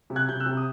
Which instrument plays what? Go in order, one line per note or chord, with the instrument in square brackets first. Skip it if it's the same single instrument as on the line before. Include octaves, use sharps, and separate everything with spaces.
[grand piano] C3
F#6 G#6
C3 G6
E6 F#6
C3
D#6